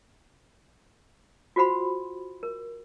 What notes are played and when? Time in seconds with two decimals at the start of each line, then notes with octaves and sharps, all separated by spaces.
1.56 F4 F#4 C5 F#5 B5 C6
2.43 A#4